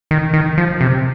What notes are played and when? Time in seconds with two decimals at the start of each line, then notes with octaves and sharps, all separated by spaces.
0.11 D#3
0.34 D#3
0.58 F3
0.81 C3